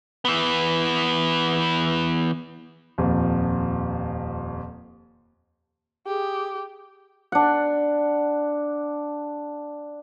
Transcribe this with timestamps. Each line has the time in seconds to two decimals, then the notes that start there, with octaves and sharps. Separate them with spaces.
0.25 E3 B3
2.98 D#1 F2
6.06 G4 G#4
7.32 D4 F#5